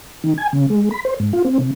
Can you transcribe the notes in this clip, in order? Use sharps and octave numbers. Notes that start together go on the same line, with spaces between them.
D#3
G#5
C#3
G#3
B5
C5
G#2
F4
C4
C3